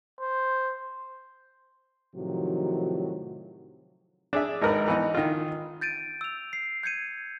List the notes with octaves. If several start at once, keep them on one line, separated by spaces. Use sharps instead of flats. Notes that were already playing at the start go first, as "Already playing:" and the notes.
C5
A2 C3 D#3 F3 F#3 F#4
D4 G#4 E5
G#1 D#4 A#4 B4
E3 B3 D#4
D#3 F4
G6 A6 D7 D#7
E6 F7
C7
G6 G#6 C#7 D#7